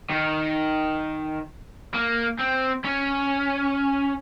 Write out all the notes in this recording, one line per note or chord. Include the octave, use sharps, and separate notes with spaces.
D#3
A#3
C4
C#4